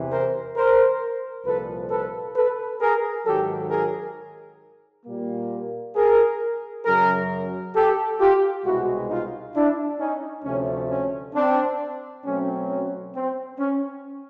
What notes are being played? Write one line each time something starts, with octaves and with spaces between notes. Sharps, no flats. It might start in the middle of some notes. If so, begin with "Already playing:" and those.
Already playing: E2 C3 E3
A#4 C5
A#4 C5
C2 A#2 F3 A4 B4
A4 B4
A4 B4
G#4 A#4
G#2 D#3 F#3 G4 A4
G#4 A#4
A#2 G3 A#3
G#4 A#4
F#2 C#3 F#3 G#4 A#4
G4 A4
F4 G4
C2 B2 G#3 E4 F#4
D#4 F4
D4 E4
C#4 D#4
D2 C3 F3 A3 C#4
C#4
C4 D4
B2 F#3 A3 C4 C#4
C#4
C4
C#4